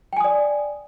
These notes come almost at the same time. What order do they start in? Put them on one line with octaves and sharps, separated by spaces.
G5 G#5 D#6 D5